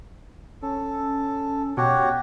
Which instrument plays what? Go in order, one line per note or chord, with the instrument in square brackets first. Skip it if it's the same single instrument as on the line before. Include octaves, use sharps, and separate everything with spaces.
[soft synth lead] C#4 [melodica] A4
[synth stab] B2 [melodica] F#4 G4 C#5